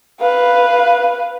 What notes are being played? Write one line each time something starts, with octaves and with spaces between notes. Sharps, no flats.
B4 F5